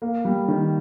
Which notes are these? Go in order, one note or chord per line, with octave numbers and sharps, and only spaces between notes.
A#3
G3
D#3